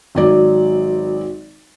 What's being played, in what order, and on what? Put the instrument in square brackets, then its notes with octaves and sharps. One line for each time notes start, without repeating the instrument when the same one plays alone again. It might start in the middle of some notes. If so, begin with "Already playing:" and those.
[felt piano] G#1 F#3 D5